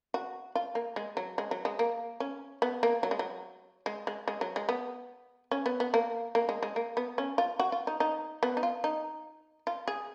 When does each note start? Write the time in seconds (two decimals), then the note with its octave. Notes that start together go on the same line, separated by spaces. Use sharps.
0.14 F#4
0.55 F4
0.75 A#3
0.96 G#3
1.17 F#3
1.38 G#3
1.51 F#3
1.65 G#3
1.79 A#3
2.20 C#4
2.62 B3
2.83 A#3
3.03 F#3
3.11 G#3
3.19 F#3
3.86 G#3
4.07 G#3
4.28 G#3
4.41 F#3
4.56 G#3
4.69 B3
5.51 C#4
5.66 B3
5.80 B3
5.94 A#3
6.35 A#3
6.49 G#3
6.63 G#3
6.76 A#3
6.97 B3
7.18 C#4
7.38 F4
7.59 F#4
7.72 F4
7.87 D#4
8.00 D#4
8.43 B3
8.57 D#4
8.63 F4
8.84 D#4
9.67 F4
9.88 G#4